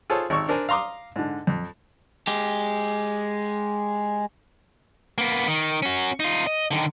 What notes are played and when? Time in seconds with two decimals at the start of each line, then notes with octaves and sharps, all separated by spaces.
0.10 F4 G#4 A4 C5 C#5
0.30 G#1 C#6 E6
0.49 D4 A#4 C5 G#5
0.69 F5 A#5 C6 D6 D#6
1.16 G#2 D3
1.47 F2
2.27 G#3 G4
5.18 A#3 B3
5.48 D#3
5.83 C#4 F#4
6.20 D#4 F4
6.47 D#5
6.71 D3 D#3